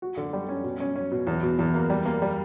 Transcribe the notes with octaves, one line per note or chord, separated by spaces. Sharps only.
F#4
D3
G3
C#4
B2
C#4
C#4
B2
E2
B2
E2
A#3
G3
A#3
G3